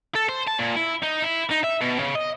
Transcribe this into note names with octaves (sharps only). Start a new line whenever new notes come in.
A4
C5
A5
A#2
E4
D#4
E4
D#4
E5
B2
C#3
D#5